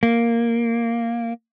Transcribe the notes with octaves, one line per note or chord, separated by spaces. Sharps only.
A#3